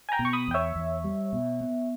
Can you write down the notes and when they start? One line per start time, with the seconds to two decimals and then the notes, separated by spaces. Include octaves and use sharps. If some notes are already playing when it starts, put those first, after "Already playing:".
0.09 G#5
0.12 G5 A#5
0.19 B2
0.25 C#6
0.33 B5 D#6
0.48 E2 G5
0.54 C#5 E5
0.76 E2
1.04 G3
1.33 B2
1.60 B3